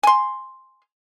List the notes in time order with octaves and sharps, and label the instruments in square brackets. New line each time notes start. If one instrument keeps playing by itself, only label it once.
[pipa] G#5 C6